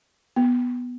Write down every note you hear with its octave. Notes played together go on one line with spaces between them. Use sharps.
B3